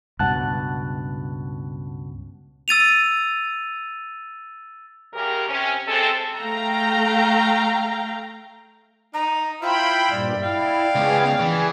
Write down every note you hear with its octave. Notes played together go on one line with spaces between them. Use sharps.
C#2 G2 B2 F#5 A5 F#6
E6 A6 D#7 F7
F#2 C#3 G4 A#4
C3 C#4
C3 G#3 C4 A4
A3 F5 G5 A#5
D#4 A#5
E4 F4 C5 F5 G5 B5
G2 A#2 G3 D5
E4 F5 G5
C#2 B3 G#4
E3 G#4